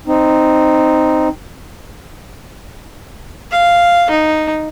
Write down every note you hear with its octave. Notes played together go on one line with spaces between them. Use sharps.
C4 D#4
F5
D#4